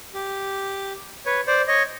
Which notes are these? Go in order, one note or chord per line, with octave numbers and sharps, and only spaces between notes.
G4
B4 C#5
C5 D5
C#5 D#5